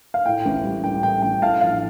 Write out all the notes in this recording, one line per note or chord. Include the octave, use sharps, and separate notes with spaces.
F5
A2 G5
A1
G3
A1 G5
A2 G5
A1 G5
A2 F5 A5
A#1 F5